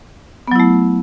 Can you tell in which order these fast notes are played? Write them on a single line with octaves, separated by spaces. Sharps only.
B3 F#3 E4 A3